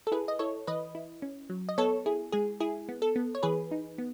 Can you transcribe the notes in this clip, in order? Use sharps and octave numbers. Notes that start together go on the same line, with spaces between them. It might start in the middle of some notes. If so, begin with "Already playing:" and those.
A4
E4 G#4 B4
D#5
E4 A4 C#5
E3 B4 D#5
E4
C#4
F#3
D#5
B3 A4 C#5
E4 G#4
G#3 G#4
E4 G#4
B3
A4
B3
C#5
E3 G#4 B4
D#4
B3